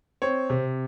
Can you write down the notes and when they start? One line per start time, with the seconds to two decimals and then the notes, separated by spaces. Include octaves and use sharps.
0.22 C4 C#5
0.50 C3